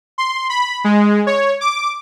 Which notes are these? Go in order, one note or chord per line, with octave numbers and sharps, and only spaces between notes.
C6
B5
G#3
C#5
D6